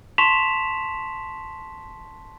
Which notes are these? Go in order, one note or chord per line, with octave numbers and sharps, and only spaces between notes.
A5 C6 C#6 B6 E7 F7